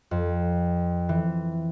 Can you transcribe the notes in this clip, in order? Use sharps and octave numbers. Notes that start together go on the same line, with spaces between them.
F2
E3